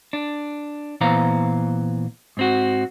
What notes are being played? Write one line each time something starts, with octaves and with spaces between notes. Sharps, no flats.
D4
A#2 E3 B3 C5 F5 A#5
G#2 C4 F#4